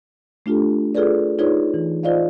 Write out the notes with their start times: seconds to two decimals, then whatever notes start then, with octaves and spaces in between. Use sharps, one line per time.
0.46 A3 D4 F4 G4 A4
0.95 F4 G#4 A4 B4 D5
1.39 D#4 F4 G#4 B4 C#5 D5
1.74 E3
2.03 F4 C5 D5 D#5 F5